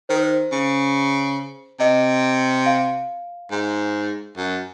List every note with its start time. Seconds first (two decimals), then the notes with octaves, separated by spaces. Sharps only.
0.09 D#3 C5
0.16 A#4
0.23 C5
0.52 C#3
1.80 C3 D#5
2.66 F5
3.51 G#2
4.37 F#2